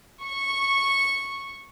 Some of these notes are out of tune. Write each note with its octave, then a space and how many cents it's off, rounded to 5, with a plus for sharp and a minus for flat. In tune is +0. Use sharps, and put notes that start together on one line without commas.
C#6 -10